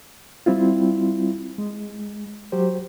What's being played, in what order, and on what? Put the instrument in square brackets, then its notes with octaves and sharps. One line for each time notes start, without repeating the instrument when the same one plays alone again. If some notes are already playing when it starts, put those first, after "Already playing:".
[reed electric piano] G3 C4 E4 F4
G#3
F#3 G4 C5